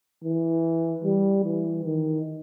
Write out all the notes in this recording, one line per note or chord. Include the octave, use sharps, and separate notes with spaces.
E3
G3
E3
D#3